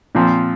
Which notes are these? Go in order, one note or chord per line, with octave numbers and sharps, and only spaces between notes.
A#2 F3 C4